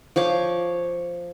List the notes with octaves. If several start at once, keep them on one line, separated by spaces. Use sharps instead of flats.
F3 C#5 D6